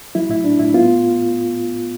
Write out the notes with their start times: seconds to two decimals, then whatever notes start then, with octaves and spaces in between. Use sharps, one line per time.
0.15 F#3 E4
0.29 A2 E4
0.44 D4
0.59 A2 E4
0.74 B3 F4